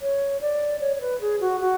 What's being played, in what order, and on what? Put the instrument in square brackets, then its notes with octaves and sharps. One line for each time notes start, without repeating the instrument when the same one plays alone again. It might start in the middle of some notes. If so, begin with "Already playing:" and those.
[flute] C#5
D5
C#5
C#5
B4
G#4
F#4
F#4